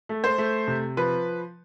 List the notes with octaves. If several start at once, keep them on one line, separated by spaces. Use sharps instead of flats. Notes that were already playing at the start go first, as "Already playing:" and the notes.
A3
C5
A3
C3
F3 B4